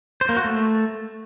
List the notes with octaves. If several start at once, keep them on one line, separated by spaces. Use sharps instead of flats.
C5
A#3
F#4
A3